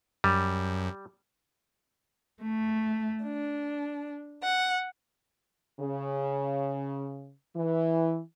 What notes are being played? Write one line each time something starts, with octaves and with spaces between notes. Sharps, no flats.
F#2 G3
A3
D4
F#5
C#3
E3